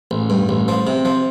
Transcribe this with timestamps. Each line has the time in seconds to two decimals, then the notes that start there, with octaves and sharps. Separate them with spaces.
0.11 A1
0.30 G2
0.49 A1
0.68 F3
0.87 C3
1.05 F3